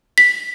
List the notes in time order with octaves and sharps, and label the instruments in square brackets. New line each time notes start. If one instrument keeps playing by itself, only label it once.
[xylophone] B6